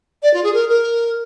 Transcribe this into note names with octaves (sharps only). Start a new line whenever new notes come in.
D5
F4
G#4
A#4
A#4